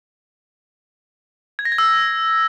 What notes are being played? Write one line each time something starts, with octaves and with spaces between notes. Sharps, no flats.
G#6
A#6
G#6
E6